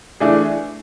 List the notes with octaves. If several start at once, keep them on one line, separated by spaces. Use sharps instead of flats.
E3 A3 D4 G#4